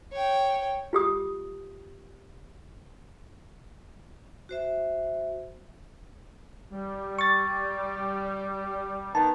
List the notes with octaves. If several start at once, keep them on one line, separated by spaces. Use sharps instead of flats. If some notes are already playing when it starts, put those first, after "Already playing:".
C#5 G5
F4 G4 D#6
F#4 C5 E5
G3
C#6 A6
D#3 B3 A5